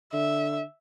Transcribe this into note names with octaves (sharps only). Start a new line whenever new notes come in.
D3 E5